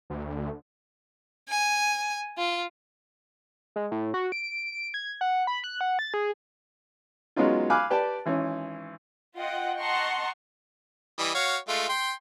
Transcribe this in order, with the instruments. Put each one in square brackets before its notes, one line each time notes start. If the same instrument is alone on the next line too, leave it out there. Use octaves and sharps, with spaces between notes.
[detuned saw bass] D2
[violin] G#5
F4
[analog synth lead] G#3
A2
F#4
D7
D7
G#6
F#5
B5
F#6
F#5
A6
G#4
[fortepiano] F#3 G#3 B3 C#4 D#4 F4
F5 G#5 B5 D6 F6 F#6
G4 B4 D5 G5 A5
G#1 E3 C#4
[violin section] F4 D#5 F#5 G5
D#5 F#5 A5 A#5 C6 C#6
[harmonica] E3 G3 D#5
F#4 C#5 F5
G#3 A3 F4
G5 C6